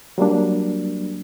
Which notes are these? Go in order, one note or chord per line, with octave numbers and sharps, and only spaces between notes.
F#3 G3 A#3 D4